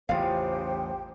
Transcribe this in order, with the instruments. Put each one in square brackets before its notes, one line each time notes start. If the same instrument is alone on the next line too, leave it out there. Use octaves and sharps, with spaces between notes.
[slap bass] A1 E2 C#3 [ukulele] F4 F5 [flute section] G4 C5 G5